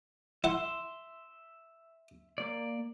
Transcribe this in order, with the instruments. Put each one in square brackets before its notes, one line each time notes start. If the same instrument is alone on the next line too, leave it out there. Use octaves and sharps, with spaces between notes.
[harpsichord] E4 F#5 [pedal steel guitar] E5 C6
[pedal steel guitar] A#3 D5